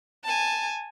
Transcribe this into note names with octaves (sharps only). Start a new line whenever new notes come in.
G#5 A5